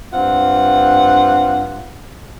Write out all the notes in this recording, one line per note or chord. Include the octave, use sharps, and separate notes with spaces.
G2 C4 F4 F#5